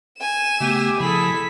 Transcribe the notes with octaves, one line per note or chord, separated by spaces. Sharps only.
G#5 E7
C#3 A3 B3 G4 E5
C#3 F3 E4 G#4 A4 B6